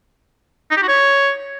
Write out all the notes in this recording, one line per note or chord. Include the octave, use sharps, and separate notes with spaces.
D#4
G4
F#4
C#5